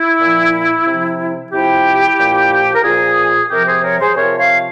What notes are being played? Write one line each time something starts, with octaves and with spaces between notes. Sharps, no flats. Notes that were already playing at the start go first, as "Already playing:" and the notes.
Already playing: E4
A#2 F3
C3 F3
C3 F3 E4 G4
A#2 F3
A#4
A#2 F3 F4 G#4
C3 F3 G4 A#4
G#4 C5
A#4 C#5
G#4 C5
C3 F3 A#4 C#5
C#5 F5